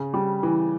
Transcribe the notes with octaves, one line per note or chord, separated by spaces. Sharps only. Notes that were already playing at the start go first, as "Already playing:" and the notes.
Already playing: C#3
G3
E3